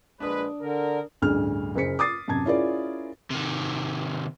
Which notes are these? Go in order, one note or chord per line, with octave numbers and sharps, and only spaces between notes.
A#1 G#3 D4 B4 D#6
D3 A#4
A1 D2 G2 G#4 F6
F#1 G#4 C5 B6 C#7
D6 D#6 A6 C7
F#2 C3 A5 G#6
C#4 E4 F4 G#4 A#4 D5
C3 D#3